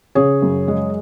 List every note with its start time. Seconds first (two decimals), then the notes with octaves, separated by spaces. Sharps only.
0.15 C#3 G#4 C#5
0.42 F#2
0.68 G#3